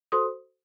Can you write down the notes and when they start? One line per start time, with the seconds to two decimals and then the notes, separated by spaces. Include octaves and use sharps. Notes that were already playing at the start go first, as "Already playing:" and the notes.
0.12 F#4 A4 C5 C6 D#6